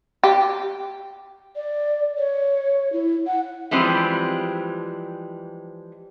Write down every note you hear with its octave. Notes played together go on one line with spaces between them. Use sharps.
G4
D5
C#5
E4
F#5
E3 F3 G3 G#3 C4 D4